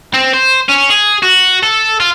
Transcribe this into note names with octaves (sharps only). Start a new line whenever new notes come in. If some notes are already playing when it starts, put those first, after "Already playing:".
C4
C5
C#4
G#4
F#4
A4
F4